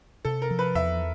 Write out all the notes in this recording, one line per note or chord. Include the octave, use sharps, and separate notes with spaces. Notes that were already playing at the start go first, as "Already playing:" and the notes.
C3 A4
A#4
F3
B4
E2 E5